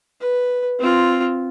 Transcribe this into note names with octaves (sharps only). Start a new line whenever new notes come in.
B4
C4 F4